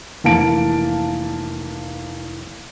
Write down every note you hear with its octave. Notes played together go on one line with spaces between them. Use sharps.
F1 E3 A#3 F5 A5 D7